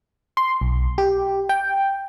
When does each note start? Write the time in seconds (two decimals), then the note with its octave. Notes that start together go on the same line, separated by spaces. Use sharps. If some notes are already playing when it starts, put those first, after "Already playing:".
0.37 C6
0.61 B1
0.98 G4
1.49 G5